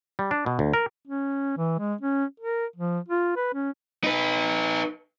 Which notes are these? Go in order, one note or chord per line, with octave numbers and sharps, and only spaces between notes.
G3
D4
B2
D2
A#4
C#4
E3
G#3
C#4
A#4
F3
F4
B4
C#4
D#4 B4